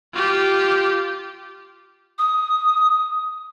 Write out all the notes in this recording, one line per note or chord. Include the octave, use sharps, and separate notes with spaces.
F4 G4
D#6